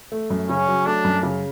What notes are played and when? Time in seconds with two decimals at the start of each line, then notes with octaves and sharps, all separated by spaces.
0.12 A3
0.30 F#2
0.49 C#3 C#4
0.68 F#3
0.86 A3 D4
1.04 F#2
1.23 C#3